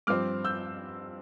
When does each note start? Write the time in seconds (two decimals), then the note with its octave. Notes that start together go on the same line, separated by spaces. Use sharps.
0.07 G2 F3 C4 D6 F6
0.44 E6 G6